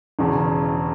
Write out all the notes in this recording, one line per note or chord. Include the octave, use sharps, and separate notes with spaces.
E1 E2 C#3